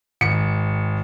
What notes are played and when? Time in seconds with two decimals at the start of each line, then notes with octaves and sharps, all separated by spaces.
0.21 G#1 C#7